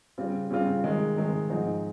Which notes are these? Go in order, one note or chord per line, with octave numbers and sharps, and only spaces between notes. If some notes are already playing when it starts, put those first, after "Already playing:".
C#3 G3 C4 F4
C#3 G3 C4 F4
C3 D#3 G#3
C3 D#3 G#3
G#2 F3 C4 D#4 G#4